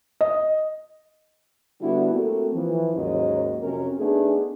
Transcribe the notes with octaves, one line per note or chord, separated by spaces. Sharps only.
D#5
D3 G3 B3 D4 E4 F#4
A3 A#3 C4 F#4 G4 A4
E3 F3
D#2 G#2 F#3 A#3 C#4 D#5
F2 C3 C#4 F#4 A#4
A3 B3 D4 D#4 G#4